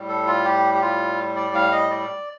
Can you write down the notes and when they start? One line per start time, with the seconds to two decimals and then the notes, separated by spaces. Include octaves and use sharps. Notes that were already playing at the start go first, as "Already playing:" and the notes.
Already playing: A2 G3
0.09 A4
0.27 F4
0.44 G4
0.74 G4
0.81 F4
1.36 D5
1.55 F5
1.72 D#5
1.91 D5